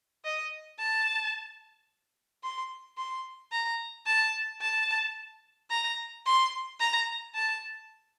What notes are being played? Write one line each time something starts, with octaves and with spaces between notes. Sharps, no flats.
D#5
A5
C6
C6
A#5
A5
A5
A#5
C6
A#5
A5